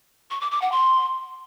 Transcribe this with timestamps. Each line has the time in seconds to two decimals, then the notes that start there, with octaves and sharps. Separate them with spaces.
0.31 C#6
0.41 D6
0.51 D6
0.62 F#5
0.72 C6